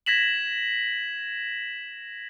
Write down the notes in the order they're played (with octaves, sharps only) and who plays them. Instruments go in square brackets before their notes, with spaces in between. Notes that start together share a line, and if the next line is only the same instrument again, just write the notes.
[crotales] G#6 A#6 B6 E7 F#7